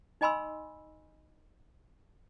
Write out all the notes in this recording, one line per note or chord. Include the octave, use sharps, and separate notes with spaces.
D#4 D#5 G#5 B5 C6 E6